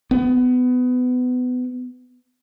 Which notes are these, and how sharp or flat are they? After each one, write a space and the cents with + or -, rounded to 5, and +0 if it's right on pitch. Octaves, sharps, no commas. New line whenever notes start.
B3 +25